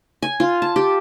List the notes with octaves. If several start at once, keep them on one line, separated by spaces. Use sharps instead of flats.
G#5
F4
A5
G4